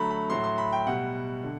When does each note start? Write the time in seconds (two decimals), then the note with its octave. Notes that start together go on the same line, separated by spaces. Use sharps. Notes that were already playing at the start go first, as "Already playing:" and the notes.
Already playing: D3 F#3 A3 A#5 B5
0.11 B5
0.29 A2 F#3 A3 C6
0.44 C6
0.58 B5
0.72 G5
0.86 B2 G3 F#5
1.43 D3